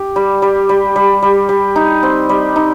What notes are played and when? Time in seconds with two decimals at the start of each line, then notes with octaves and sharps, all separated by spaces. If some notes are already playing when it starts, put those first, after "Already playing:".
Already playing: G4
0.16 G3
0.42 G3
0.69 G3
0.96 G3
1.22 G3
1.49 G3
1.76 D#4
2.03 C4
2.29 G3
2.56 D#4